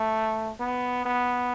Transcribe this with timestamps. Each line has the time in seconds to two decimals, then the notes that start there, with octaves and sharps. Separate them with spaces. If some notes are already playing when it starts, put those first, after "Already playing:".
Already playing: A3
0.60 B3
1.06 B3